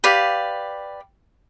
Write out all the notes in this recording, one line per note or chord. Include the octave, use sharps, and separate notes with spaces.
G4 B4 D5 F5